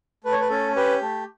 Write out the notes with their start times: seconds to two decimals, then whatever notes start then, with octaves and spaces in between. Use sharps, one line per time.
0.24 A3 B4
0.32 C#5
0.41 B4
0.50 C#4 A4
0.76 G4 B4
1.02 A3